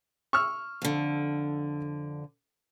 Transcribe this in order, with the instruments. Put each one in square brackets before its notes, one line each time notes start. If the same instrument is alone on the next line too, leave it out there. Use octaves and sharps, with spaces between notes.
[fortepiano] C#6 E6 F6
[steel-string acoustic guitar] F2 D3